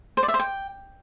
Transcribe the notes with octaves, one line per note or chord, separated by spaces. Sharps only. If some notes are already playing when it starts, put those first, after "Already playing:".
C5
D5
E5
C5
G5